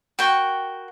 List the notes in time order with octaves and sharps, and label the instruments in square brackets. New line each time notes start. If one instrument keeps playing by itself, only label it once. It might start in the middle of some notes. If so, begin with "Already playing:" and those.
[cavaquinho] F#4 A#4 G5 C#6